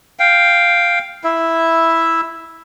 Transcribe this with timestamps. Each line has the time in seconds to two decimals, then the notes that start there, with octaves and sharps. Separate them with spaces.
0.19 F5 G5
1.24 E4 E5